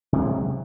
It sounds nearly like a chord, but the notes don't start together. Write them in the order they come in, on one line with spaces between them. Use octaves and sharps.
C3 G#3 F#3